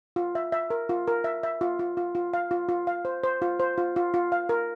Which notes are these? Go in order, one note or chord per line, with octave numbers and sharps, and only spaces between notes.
F4
E5
E5
A#4
F4
A#4
E5
E5
F4
F4
F4
F4
F5
F4
F4
F5
C5
C5
F4
C5
F4
F4
F4
F5
A#4